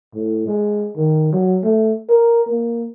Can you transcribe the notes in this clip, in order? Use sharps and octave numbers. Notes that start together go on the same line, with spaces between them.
A2
G#3
D#3
F#3
A3
A#4
A#3